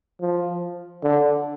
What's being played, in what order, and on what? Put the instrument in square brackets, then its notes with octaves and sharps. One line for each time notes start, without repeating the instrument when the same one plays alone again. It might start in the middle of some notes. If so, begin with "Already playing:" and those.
[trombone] F3
D3